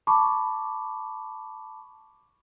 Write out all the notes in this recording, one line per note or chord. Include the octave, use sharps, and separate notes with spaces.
A5 B5 C#6 D6